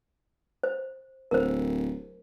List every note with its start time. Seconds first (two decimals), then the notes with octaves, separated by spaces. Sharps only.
0.63 C5
1.31 D1 A#4 C5